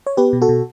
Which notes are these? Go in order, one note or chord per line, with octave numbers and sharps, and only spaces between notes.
C#5
B3 G4 B4
B2
F#4 A4
B2